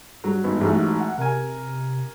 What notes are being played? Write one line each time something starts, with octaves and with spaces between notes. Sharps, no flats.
G2 F#3
G#1 B3
A1 G#2 F#3
F#5
C3 A#4 G#5